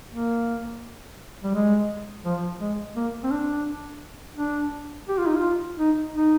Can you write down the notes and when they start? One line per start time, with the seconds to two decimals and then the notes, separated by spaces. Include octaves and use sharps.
0.13 A#3
1.44 G3
1.54 G#3
2.25 F3
2.61 G#3
2.96 A#3
3.23 C4
3.31 D4
4.37 D4
5.09 G4
5.18 F4
5.27 D#4
5.36 F4
5.79 D#4
6.15 D#4